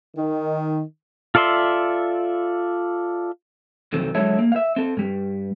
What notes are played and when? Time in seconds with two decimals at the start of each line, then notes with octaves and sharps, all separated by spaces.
0.16 D#3
1.35 F4 A4 D5 E5 C6
3.93 B1 F2 D#3 F#3 C4 A4
4.15 D3 F#3 G#3 A4 C#5 E5
4.39 A#3
4.52 E5 F5
4.76 C4 A4
4.97 G2 G3